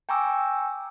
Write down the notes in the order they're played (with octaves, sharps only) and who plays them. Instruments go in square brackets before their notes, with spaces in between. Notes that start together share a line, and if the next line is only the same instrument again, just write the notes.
[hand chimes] G5 G#5 A#5 C#6 D6 E6